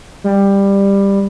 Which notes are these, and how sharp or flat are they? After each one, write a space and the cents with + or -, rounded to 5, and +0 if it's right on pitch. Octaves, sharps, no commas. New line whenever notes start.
G3 +15